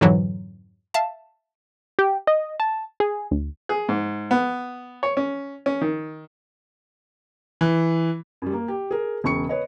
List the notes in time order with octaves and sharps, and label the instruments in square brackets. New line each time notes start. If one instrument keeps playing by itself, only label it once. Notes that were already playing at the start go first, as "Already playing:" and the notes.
[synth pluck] F2 G#2 D3 E3 F#3
E5 F5 A5
[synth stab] G4
D#5
A5
G#4
D2
[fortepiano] G#4
G#2
B3
C#5
C#4
C#4
D#3
[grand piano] E3
[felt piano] F#2 G3
A#3
G4
G#4 A#4
E1 C#3 C#6 C#7
B4 C#5 D#5